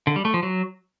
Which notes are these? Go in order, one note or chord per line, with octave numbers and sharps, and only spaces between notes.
D3
G3
A3
F3
F#3